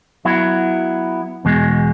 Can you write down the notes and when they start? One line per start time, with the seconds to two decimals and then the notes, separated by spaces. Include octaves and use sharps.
0.25 F#3 B3 E4
1.45 E2 B2 G#3